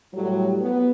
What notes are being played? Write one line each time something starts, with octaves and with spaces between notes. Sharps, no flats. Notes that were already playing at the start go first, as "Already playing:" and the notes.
A2 F#3 G3
B3